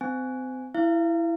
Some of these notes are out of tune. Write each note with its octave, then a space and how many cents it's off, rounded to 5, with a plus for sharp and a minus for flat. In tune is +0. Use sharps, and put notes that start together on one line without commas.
C4 -30 G#5 +0
E4 +5 F5 -35